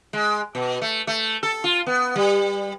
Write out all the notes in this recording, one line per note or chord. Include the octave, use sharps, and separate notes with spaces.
G#3
B2
A3
A3
A4
F4
B3
G3